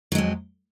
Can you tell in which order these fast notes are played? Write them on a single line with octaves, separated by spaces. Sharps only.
F#3 G#3 F2